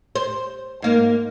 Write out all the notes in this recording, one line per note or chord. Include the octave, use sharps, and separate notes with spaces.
C5
G#2 A#3